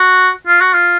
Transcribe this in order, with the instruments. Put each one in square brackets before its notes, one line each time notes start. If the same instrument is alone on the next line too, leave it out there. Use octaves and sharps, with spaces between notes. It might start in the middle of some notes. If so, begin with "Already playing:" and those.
Already playing: [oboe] F#4
F4
F#4
F4